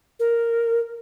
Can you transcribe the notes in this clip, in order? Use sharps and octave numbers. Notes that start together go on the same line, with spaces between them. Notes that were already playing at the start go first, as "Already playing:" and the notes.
A#4